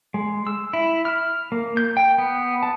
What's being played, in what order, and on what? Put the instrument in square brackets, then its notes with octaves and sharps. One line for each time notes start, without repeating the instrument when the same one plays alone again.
[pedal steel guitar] G#3
E6
E4
F6
A#3
G6
G5
B3
A5